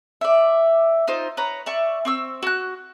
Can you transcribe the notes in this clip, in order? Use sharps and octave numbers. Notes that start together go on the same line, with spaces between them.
D5 E5
D#4 F4 C5
B4 C#5 A#5
D5 E5 C#6
C4 C#6 E6
F#4 F#6